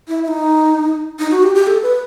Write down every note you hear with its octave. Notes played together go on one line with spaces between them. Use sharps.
E4
E4
D#4
D#4
F#4
G4
G4
A4
B4